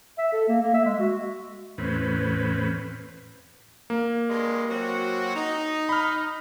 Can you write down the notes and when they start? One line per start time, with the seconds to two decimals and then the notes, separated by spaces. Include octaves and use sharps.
0.18 E5
0.33 A4
0.48 A#3
0.62 A#3
0.74 E5
0.86 G#3
1.00 F#4
1.78 E2 A2 C4 C#4 B4
3.90 A#3
4.29 G2 G3 G#3
4.70 F#3 C4 F#4
5.35 D#4
5.89 B5 F6